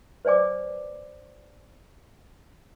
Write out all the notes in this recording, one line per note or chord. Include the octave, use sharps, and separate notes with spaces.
B4 C5 D5 G#5 D6